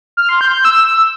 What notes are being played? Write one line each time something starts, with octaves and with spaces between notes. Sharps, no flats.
F6
C6
G6
G6
E6